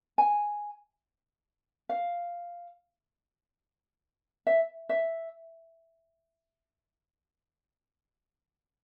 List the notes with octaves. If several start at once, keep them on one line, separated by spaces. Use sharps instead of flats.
G#5
F5
E5
E5